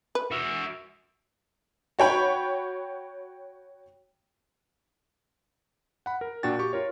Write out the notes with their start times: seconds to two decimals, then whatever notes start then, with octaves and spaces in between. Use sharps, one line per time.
0.15 B4
0.31 F#4 E5
1.99 F#4 C#5 G5 B5
6.06 F#5 B5
6.21 A#4
6.43 A#2 D4 F#4 G5 A6
6.59 G4 C#6
6.73 F4 A#4 C#5